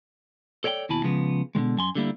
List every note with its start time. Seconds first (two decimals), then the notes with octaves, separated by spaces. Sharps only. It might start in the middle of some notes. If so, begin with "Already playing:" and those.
0.64 A4 C#5 D5 F5 G5
0.89 D#2 B2 E4 G#5 A5 B5
1.03 C#3 F3 G#3 B3
1.55 B2 D3 D#3 G#3
1.77 F#2 G#5 C6
1.95 D3 G3 A#3 E4